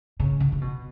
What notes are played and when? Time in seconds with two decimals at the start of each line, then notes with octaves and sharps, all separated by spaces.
0.20 C#3
0.40 C#3
0.52 C#3
0.61 B2